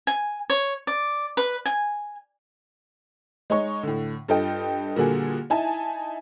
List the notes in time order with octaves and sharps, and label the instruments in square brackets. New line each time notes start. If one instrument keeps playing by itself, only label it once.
[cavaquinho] G#5
C#5
D5
B4
G#5
[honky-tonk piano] G#3 D#4 C#5 C#6
A2 D3
G2 F4 A4 D#5 G5
A#2 D3 G3 A#3 F#4 G#4
D#4 E4 G#5 A5